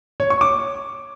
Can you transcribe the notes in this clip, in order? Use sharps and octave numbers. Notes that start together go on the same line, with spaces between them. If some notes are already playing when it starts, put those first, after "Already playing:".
C#5
C#6
D6